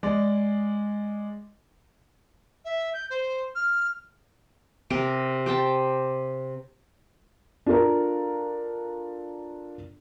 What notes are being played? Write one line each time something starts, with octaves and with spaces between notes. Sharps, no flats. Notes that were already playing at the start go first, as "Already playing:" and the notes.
G#3 D5
E5
G6
C5
F6
C3 G4 A#4
G4 C5 G5 A5
D4 F4 A4 A#4